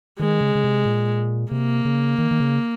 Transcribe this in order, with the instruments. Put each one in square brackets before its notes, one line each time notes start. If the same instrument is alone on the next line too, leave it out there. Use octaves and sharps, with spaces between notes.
[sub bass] D#3 [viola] G#3
[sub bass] C#3
C#3
C3
A#2
[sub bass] C3 [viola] A#3
[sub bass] C#3
D#3
D#3
C#3